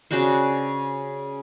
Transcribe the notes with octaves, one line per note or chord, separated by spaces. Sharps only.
C#3 D4 F#4 C5